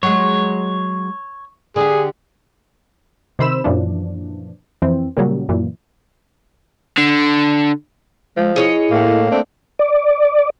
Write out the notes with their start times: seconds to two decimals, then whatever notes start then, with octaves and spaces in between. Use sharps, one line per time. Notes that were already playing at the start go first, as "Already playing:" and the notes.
0.03 F#3 G#3 C#5
1.76 D3 G4 G#4
3.39 C3 D#3 C5 B5 E6 E7
3.64 F#2 A#2 E3 F3 D4
4.82 F2 E3 C4
5.17 A#2 C#3 F#3 G3
5.49 F#2 A#2 E3
6.98 D3
8.37 F3 G#3
8.56 E4 G#4 C#5 D#5
8.91 A2 A#3
9.30 A3 C4 D4
9.79 D5